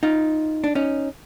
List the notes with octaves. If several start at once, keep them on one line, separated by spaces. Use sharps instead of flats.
D#4 F4
D4
C#4 D#4